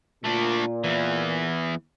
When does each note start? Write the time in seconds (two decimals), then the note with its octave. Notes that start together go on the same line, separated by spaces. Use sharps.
0.24 A#2 A3 D4
0.84 E2 E3